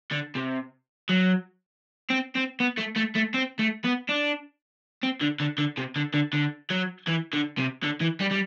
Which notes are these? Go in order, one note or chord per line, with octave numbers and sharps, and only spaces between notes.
D3
C3
F#3
C4
C4
B3
A3
A3
A3
C4
A3
B3
D4
C4
D3
D3
D3
C3
D3
D3
D3
F#3
E3
D3
C3
D3
E3
G3
G3